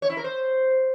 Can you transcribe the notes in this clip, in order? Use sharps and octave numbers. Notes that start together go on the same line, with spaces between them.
C#5
E4
A#4
C5